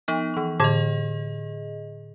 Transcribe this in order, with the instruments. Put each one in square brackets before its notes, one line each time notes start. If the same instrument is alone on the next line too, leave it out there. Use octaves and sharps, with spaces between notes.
[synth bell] F3 B3 D#4
E3 C#6
[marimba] A2 D3 G#6 [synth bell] G#4 D#5